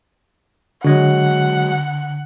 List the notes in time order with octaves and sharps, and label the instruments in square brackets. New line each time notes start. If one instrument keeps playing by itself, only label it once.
[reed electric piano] D3 [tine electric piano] F#3 G#3 F#4 [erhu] F#5